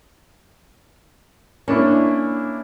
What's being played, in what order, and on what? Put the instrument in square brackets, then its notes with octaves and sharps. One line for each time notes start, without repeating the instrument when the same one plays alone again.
[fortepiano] A#3 D4 E4 [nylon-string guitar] C#4